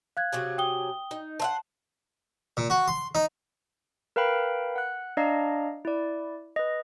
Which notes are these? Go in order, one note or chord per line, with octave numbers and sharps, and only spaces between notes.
F5 F#6 G#6
C3 F#3 G#4
G5 D#6 G7
D#4
C5 E5 F#5 A5
A#2
F#4
C6
D#4
A#4 B4 F5 G5 B5
F#5 F#6
D4 D5 D#5 F5 A#5
E4 D5
B4 D#5